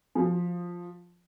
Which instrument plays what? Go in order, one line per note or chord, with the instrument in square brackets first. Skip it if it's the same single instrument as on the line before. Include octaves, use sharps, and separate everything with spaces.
[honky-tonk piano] F3